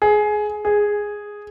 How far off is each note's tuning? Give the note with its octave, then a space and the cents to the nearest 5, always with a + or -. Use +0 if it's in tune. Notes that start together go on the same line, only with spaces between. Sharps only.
G#4 +15
G#4 -5